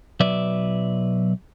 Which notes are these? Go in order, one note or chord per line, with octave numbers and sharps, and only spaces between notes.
B1 F#3 B4 D5 E5